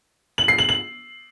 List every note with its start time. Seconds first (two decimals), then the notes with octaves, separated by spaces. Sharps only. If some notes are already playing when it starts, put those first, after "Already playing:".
0.38 F#7
0.48 C7
0.58 F#7
0.69 F#7